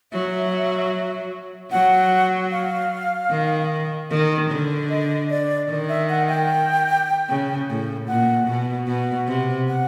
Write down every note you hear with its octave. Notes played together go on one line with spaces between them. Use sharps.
F#3 E5
F#3 F#5
F5
D#3
D#3
D3
D#5
D5
D#3
E5
F#5
G5
C#3
A2
A#2 F#5
B2
B2 F#5
C3
F#5